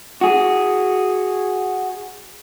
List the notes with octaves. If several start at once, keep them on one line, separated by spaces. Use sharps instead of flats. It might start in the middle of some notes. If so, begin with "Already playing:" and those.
F#4 G#4